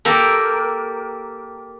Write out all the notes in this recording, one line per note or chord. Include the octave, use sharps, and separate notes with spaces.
A#3 G4 A4 A#4